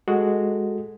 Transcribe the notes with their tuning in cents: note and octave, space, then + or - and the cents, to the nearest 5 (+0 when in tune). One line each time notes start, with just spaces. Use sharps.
G#3 +0 F#4 +0 A4 +0